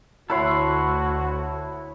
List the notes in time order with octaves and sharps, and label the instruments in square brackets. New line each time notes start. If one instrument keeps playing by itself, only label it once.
[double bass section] D2 [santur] E4 C#5 [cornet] F#4 [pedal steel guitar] A4 F#5 C6